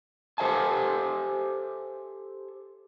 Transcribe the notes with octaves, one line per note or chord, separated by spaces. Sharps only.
G4 A4 C5 E5 G#5 A5